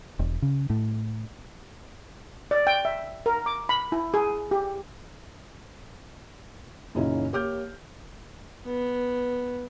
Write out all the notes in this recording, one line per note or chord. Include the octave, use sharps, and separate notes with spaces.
E1
C#3
A2
D5
G5
E5
A#4
D6
B5
E4
G#4
G4
F#2 A#2 C#3 C#4 D#4 E4
A#3 G4 C#5 D6 F6 G6
B3